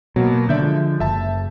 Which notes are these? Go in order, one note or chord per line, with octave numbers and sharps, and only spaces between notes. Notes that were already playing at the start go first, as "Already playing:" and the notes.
B2 F#3 A#3
D3 D5 E5 G6
F3 G#3
F#1 E5 A5